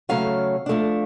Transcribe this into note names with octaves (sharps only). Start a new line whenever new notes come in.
C#3 F#3 A3 C#4 F5
F3 A3 D4